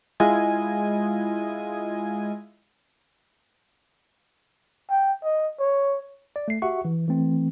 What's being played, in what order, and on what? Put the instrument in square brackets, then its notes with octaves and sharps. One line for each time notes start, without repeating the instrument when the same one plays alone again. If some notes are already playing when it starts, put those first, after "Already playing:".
[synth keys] G#3 E4 F4 D#5 G#5
[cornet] G5
D#5
C#5
[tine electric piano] D5
A3 C7
F#4 G4 E5 F#5 C#6
E3
E3 A3 C4